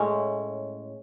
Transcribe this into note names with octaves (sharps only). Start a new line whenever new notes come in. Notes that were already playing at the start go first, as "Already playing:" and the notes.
Already playing: A2 G#3 C#4